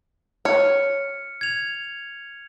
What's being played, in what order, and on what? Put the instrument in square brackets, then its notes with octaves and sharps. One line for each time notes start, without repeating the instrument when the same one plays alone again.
[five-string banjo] C#5 [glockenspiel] F6 C#7
[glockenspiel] G#6 F7